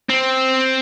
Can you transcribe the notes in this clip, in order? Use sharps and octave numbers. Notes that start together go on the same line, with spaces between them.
C4